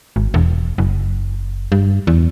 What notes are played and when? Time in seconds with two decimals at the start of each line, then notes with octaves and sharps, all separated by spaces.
0.16 G#1
0.34 E1
0.78 F#1
1.72 G2
2.07 E2